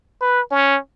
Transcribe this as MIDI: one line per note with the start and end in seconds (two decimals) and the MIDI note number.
0.22 0.41 71
0.51 0.78 61